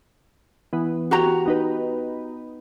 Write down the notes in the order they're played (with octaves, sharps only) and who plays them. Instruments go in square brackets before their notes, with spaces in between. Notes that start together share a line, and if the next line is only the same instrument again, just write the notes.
[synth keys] E3 B3
[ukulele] F#4 G4 A#5
[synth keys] B3 D#4 B4